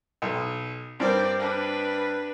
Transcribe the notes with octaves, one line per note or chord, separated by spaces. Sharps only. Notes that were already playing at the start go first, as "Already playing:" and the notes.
B1
G2 C4 A#4 D5 G5
D4 B4